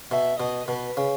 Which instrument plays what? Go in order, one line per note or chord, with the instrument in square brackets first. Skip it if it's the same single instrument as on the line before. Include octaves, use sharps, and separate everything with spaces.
[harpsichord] B2 [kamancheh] E5
[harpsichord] B2 [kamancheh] D#5
[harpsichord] B2 [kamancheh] B4
[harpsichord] C#3